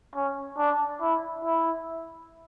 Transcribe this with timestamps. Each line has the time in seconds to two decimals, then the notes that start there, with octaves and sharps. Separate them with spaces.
0.15 C#4
0.58 D4
1.01 E4
1.44 E4